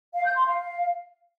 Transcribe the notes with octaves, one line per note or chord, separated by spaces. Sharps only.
F5
G6
C6
F5